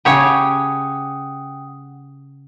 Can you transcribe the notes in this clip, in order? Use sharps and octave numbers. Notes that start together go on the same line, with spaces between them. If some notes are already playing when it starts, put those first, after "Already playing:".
C#3 G4 C#5 F#5 G5 D#6